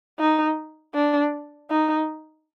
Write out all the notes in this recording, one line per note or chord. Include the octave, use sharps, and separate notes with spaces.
D#4
D4
D#4